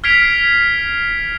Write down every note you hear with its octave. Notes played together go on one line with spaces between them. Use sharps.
F6 G#6 B6 C7 D7 F7